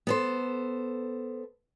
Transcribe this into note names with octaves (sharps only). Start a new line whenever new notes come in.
B3 A4 C5